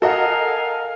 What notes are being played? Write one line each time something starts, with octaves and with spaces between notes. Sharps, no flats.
A4 A#4 D#5 F5 F#5 G#5